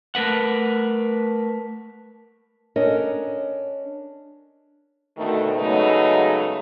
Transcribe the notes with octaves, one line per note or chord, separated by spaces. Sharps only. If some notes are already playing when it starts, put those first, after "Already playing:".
A3 A#4 B4 F#5
C#4 D4 A4 A#4 C#5 D#5
D2 B2 D#3 A3
C#3 F#3 G#3 A3 B3 D#4